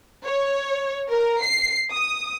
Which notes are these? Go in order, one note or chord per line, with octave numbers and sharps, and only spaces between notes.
C#5
A#4
C7
D#6